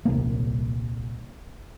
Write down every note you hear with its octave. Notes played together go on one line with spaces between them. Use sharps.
D#1 C2 A#3